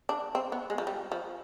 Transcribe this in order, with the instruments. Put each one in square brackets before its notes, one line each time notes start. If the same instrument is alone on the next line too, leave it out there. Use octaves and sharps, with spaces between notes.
[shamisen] D4
C4
B3
G#3
F3
G3
F3